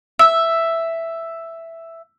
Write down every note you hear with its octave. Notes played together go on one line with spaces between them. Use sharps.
E5 E6